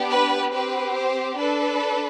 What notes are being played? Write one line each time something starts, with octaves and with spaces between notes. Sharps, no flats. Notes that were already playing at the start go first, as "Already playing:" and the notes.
Already playing: B3 D4 G4
B4
C4 G4 B4
C5
D4 A4 B4